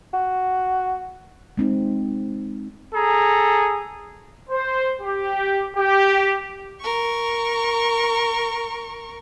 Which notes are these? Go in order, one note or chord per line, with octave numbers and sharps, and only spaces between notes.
F#4
G#3 C4 D#4
G#4 A4 A#5
C5
G4
G4
A#4 C#6